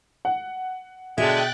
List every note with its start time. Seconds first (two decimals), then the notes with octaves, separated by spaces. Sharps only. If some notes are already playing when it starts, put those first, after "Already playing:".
0.25 F#5
1.18 B2 D3 G#3 E5 G5 F#6 A6